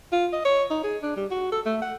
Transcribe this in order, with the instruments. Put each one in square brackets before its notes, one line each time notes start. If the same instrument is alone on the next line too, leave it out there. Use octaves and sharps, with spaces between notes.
[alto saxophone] F4
D#5
C#5
D#4
G#4
D4
G3
F#4
A4
A3
F#5